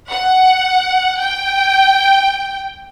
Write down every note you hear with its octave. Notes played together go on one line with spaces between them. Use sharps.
F#5
G5